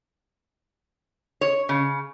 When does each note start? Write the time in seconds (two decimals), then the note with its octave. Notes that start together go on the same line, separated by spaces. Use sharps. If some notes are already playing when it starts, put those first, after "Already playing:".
1.41 C#5
1.69 C#3